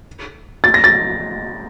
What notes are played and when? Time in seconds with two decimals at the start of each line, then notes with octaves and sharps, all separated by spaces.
0.64 A6
0.74 A#6
0.84 A6